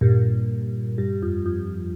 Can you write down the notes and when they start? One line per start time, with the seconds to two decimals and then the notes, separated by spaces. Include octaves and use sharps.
0.01 G2 A#2
0.98 G2
1.22 F2
1.46 F2